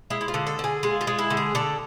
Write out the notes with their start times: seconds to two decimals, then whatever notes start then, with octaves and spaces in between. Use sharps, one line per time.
0.10 G#3 E4
0.21 E4
0.28 F4
0.34 D3
0.47 A4
0.59 D3 G#4
0.83 G#3 F4
1.01 F4
1.07 G#3
1.19 E4
1.30 D3
1.37 G#4
1.55 D3 A4